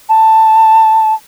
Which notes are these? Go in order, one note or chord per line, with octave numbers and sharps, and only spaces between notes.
A5